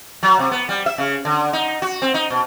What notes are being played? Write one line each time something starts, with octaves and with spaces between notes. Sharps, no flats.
F#3
C3
B3
G3
E5
C#3
D3
D#4
F#4
C4
D#4
B2